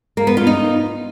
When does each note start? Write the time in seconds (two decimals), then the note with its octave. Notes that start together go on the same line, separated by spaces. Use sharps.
0.17 A#3
0.27 B3
0.37 F4
0.47 D#4